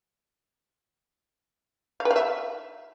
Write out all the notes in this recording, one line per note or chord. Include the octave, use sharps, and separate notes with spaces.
F5
B4
F5
E5